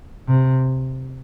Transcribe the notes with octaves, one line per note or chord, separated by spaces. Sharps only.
C3